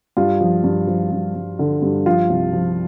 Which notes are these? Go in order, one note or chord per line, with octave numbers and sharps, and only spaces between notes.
G2 F4
F3
G2
F3
G2
G2
D3
G2
F3 F4
C2
F3